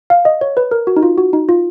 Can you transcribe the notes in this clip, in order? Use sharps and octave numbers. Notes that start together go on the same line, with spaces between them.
F5
D#5
C#5
B4
A#4
F#4
D#4
F4
F#4
D#4
F4